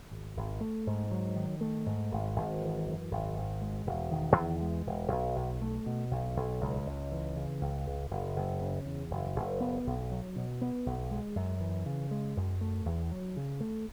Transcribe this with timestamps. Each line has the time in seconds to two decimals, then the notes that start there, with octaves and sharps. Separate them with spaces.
0.11 G#1
0.36 G#1
0.61 A3
0.87 G#2
1.11 F#3
1.36 D#3
1.61 A3
1.86 G#2
2.11 G#1
2.36 G#1
2.61 E3
2.86 F#2
3.11 G#1
3.36 G#1
3.62 G#3
3.86 E1
4.11 D#3
4.36 E2
4.61 G#3
4.86 E1
5.12 B1
5.36 B1
5.62 A3
5.86 B2
6.11 B1
6.36 B1
6.61 C#2
6.86 C#2
7.12 E3
7.36 C#3
7.61 C#2
7.86 C#2
8.10 F#1
8.36 F#1
8.61 C#3
8.85 E2
9.11 F#1
9.35 F#1
9.60 B3
9.86 B1
10.11 F#3
10.36 B2
10.62 B3
10.86 B1
11.11 G#3
11.35 F#2
11.60 E3
11.86 C#3
12.11 G#3
12.36 F#2
12.61 A3
12.86 E2
13.11 F#3
13.37 C#3
13.60 A3